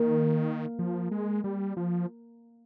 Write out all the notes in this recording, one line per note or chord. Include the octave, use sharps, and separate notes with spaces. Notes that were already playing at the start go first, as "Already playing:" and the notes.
Already playing: D#3 A#3
F3
G#3
G3
F3